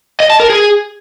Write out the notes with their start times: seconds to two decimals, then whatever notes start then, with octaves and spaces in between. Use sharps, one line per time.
0.20 D#5
0.30 A5
0.40 A#4
0.50 G#4